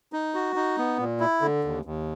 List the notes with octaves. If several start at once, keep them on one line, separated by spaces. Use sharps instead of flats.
D#4
F#4
D#4
B3
A#2
E4
D3
D#2
D#2